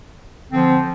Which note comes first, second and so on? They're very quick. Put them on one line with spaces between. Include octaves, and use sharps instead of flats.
D3 C4 F3